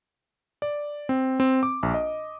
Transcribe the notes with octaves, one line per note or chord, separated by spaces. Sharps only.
D5
C4
C4
D6
A#1
D#5